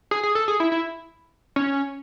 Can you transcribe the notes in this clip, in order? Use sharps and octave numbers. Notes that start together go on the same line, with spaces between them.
G#4
G#4
A4
G#4
E4
E4
C#4